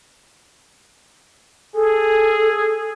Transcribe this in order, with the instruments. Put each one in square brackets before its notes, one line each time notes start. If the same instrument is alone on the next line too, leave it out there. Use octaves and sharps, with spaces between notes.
[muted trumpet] G#4 [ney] A4